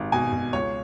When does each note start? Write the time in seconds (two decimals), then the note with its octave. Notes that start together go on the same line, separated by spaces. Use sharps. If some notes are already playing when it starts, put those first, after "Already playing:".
Already playing: G#1
0.12 B2 G#5
0.33 B2
0.53 C#2 C#5